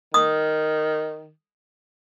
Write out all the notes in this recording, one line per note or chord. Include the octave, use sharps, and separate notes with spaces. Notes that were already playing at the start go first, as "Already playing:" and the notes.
D#3 D#6